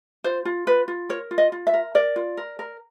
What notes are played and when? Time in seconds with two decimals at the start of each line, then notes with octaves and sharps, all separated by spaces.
0.24 F4 C5
0.45 F4
0.67 F4 B4
0.88 F4
1.09 A#4 C#5
1.31 F4
1.38 D#5
1.52 F4
1.67 E5
1.73 A#4
1.95 A#4 D5
2.16 F4
2.37 A#4
2.59 A#4